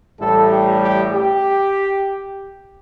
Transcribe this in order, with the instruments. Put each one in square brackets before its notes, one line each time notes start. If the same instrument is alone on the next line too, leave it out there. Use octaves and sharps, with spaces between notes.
[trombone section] A1 A2 G3 A4
G4
G4
G4